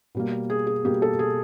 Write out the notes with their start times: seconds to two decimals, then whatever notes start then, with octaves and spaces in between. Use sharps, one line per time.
0.15 B2 G3 A#3
0.50 G#4
0.67 G#4
0.85 B2 G3 A#3 G4
1.02 A4
1.19 G#4